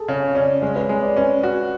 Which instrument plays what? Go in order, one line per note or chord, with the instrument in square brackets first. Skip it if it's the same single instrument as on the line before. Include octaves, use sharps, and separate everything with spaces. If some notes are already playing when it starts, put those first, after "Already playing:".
Already playing: [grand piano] G#4 A4
[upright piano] C#3 [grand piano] C#5
[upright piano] C#4 [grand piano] D5
[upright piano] G#3 [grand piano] C#5
[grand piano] B4
[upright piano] G#3 [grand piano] C#5
[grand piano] D5
[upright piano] C#4 [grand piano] B4
[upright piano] F#4